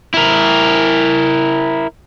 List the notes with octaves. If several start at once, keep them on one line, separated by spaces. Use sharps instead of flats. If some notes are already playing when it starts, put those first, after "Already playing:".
E4 A#4